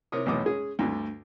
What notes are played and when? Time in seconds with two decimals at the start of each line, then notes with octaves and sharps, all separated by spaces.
0.12 C3 A#4 C#5 D#6
0.26 B1 E2 A2 C#5 D6 D#6
0.46 G#3 C#4 G#4
0.79 D2 G2 D3